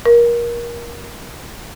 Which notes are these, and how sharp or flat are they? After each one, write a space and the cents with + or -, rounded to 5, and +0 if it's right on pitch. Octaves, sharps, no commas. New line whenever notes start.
A#4 +25